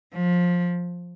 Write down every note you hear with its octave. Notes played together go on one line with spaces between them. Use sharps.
F3